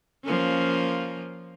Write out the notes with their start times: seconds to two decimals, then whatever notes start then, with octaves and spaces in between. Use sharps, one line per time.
0.24 F3 A#3 C#4